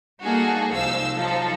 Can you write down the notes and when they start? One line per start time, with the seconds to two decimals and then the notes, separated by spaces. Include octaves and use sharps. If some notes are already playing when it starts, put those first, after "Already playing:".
0.22 G3 A#3 D#4 F#4 G#4 A4
0.72 C2 F3 D#4 C5 F5 E6
1.14 F3 F#3 D#4 A4